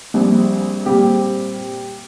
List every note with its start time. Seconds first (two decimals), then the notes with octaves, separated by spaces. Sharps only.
0.14 A#1 A#2 G3 C4
0.85 A#2 G3 C4 G4